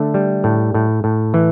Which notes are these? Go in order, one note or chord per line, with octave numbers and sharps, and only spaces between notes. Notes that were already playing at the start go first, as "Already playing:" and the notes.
Already playing: D3 A3 A4
G3
A2
A2
A2
E3